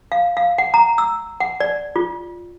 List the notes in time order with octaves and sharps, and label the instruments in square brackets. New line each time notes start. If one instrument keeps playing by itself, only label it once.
[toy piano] F5
F5
F#5
A#5
E6
F#5
D5
F4